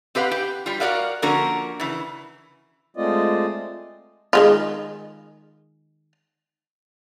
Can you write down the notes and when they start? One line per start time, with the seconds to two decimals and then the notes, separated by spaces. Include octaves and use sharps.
0.15 C4 G4 B4 F5 F#5
0.31 G4
0.66 G3 F4
0.80 F#4 A#4 D5 F5 F#5
1.22 D3 F3 A#3 C#4 F#4 A#4
1.80 C#3 E3
2.97 G#3 A3 C4 F4 D5 D#5
4.33 D#3 G#3 F4